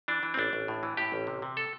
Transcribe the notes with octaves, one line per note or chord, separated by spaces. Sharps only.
E3 D4
E3
C4
A1 D4
A1
A2
E3
A2 G4
A1
C3
C3
A4